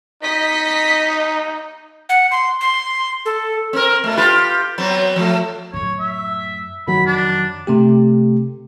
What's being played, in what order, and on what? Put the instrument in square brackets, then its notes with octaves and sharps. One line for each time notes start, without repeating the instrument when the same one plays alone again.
[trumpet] D#4 [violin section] D#5 B6
[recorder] F#5
C6
C6
A4
[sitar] C4 A#4
B2 A3
F4 G4 B4
F#3 B3 C4
F3 A3
[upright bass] F#2 A2 [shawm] C#5
[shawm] E5
[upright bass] F#1 F2 [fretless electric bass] D#3 F#3 [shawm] B5
[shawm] D4
[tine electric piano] C3 A3 G4